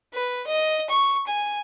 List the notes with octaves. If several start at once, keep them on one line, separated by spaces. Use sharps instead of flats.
B4
D#5
C#6
G#5